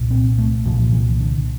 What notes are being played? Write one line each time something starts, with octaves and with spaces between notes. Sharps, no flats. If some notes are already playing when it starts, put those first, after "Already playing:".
Already playing: C2 A#2
C4
A3
C2 A#2 F3
E3
D3